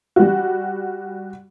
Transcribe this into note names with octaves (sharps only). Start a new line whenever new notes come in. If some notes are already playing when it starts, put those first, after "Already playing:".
G3 F#4